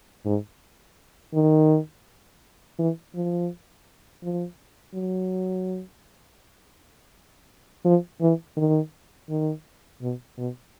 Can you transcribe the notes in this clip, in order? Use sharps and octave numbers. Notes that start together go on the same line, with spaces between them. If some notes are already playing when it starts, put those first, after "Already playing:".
G#2
D#3
E3
F3
F3
F#3
F3
E3
D#3
D#3
B2
B2